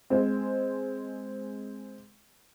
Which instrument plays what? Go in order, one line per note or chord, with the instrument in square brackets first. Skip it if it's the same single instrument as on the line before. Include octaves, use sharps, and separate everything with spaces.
[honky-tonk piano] G#3 C4